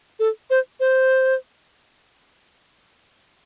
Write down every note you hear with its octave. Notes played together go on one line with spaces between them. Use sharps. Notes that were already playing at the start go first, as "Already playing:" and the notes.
A4
C5
C5